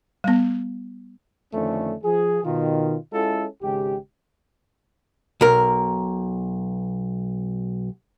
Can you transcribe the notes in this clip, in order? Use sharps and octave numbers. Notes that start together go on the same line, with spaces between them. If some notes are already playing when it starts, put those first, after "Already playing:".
G3 B3
F2 D3 D#3 A3 C#4 D4
F3 G#4
B2 D#3 F4
G#3 C#4 E4 F4 A4
G#1 C#3 G#3 G4
B1 A#4